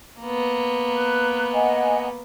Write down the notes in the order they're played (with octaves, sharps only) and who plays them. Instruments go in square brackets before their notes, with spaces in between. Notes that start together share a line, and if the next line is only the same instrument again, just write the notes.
[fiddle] A#3 B3
[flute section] B4 F#6
D#5 F#5 G#5